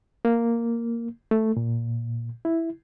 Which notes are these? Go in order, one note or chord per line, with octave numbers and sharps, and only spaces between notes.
A#3
A3
A#2
E4